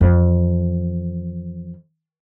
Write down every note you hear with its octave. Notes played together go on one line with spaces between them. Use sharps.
F2 E3